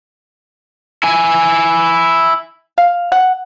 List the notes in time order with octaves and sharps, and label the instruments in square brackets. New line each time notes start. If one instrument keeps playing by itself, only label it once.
[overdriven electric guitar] E4 G#5
[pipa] F5
F#5